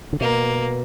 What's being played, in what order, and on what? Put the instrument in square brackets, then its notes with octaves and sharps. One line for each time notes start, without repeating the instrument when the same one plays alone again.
[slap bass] D3
[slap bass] B2 [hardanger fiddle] A#3